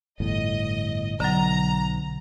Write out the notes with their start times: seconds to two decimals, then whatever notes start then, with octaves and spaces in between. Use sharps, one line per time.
0.20 G1 E2 A2 D#5
1.20 B1 D3 F#3 A#5